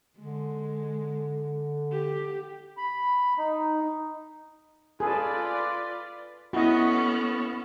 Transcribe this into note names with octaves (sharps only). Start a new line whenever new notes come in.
D3 G#3
G4
B5
D#4
F4 G#4 A4 B4 D5
B3 C#4 E4 F#4 A4 D#5